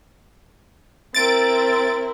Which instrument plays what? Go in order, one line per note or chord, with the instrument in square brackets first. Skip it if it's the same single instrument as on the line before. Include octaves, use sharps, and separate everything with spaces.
[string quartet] C4 E4 A#4 [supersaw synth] A6 D7